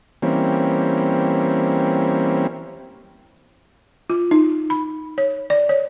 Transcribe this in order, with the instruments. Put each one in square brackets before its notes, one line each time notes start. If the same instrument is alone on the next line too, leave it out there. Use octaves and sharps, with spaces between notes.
[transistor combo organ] E3 G3 A#3 C4 C#4
[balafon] F4
D#4
B5
C#5
D5
C#5